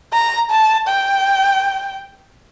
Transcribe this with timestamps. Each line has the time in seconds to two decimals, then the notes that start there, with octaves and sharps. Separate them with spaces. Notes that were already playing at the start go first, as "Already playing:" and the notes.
0.13 A#5
0.51 A5
0.88 G5